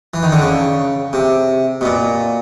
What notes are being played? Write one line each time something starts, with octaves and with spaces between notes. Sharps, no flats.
E3
D#3
D3
C#3
C3
B2
A#2